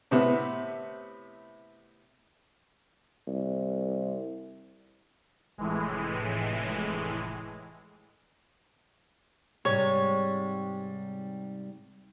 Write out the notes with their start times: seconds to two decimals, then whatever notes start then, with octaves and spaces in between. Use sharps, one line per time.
0.11 A2 C3 B3
3.27 C2
5.58 F1 A2 E3 G#3
9.65 G#2 C3 G3 C#5